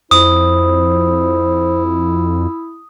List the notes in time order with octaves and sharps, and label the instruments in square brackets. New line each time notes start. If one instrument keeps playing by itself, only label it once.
[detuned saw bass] F2 [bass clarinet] E4 [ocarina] C5 [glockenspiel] D#6